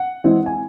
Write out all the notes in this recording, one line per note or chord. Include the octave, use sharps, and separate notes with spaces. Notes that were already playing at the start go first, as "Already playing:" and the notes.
Already playing: F#5
E3 G#3 C4 E4
G#5